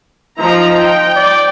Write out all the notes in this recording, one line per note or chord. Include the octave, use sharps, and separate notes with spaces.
F3 D#4 A#5
G5
D5